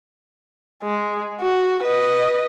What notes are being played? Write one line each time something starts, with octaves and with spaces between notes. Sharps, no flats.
G#3
F#4
B4 D#5